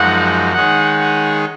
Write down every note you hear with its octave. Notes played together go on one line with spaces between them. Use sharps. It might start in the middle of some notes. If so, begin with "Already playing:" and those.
Already playing: F#2 F3 G#3 D#4 F#4 F#5
D#3 G#3 D#4 G#4 C#5 F#5
F#5